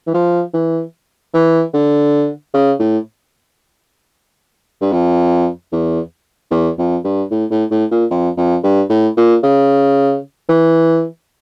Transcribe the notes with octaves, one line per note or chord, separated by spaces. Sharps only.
E3
F3
E3
E3
D3
C#3
A2
G2
F2
E2
E2
F2
G2
A2
A2
A2
A#2
F2
F2
G2
A2
A#2
C#3
E3